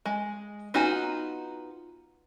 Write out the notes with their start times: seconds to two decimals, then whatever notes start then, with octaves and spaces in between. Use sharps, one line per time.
0.06 G#3
0.74 B3 D#4 F4 F#4 G#5